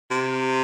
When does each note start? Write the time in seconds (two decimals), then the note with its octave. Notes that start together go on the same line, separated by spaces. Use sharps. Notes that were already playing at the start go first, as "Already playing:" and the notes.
0.11 C3